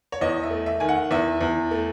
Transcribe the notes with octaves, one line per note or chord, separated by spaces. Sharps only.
C#5
E2 D#5
E5
A3
E5
D#3 G#5
F#5
E2 E5
E2
A3